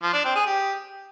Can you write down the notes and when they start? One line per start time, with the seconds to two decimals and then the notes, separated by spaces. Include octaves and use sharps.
0.03 F3
0.14 D4
0.25 C4
0.36 G#4
0.47 G4